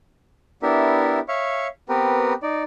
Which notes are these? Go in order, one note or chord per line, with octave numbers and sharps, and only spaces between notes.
B3 D4 E4 G4 A#4 E5
C#5 E5 F5 C#6
B3 C4 G4 A#4 B4
D#4 D5